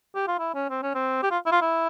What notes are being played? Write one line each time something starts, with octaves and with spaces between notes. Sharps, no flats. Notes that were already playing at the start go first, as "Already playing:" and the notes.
G4
F4
E4
C#4
C4
C#4
C4
G4
F4
E4
F4
E4